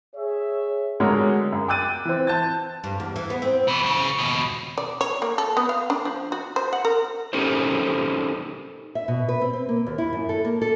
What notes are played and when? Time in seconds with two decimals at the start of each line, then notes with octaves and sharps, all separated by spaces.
0.15 G#4 C#5 E5
1.00 D3 F#3 G#3 F#4 A#4 C#5
1.52 F#2
1.68 G5 D6 E6 F#6 A6 D#7
2.05 E3 C4
2.27 A5 G6 A6
2.84 G2
3.00 E2
3.16 E3
3.30 B3
3.42 C4
3.68 B2 E3
3.83 B1 C#3
4.19 D#2 B2
4.78 D5
5.01 C#5
5.22 A#3
5.38 A4
5.57 B3
5.69 F5
5.90 D4
6.05 F3
6.32 F#4
6.56 C5
6.73 F#5
6.85 A#4
7.33 C#4 D#4 G4 A4 A#4 C5
8.95 E5
9.08 B2
9.29 B4
9.41 C4
9.53 C4
9.69 A#3
9.87 D#2
9.98 E4
10.13 F#2
10.29 A4
10.45 A#3
10.62 A4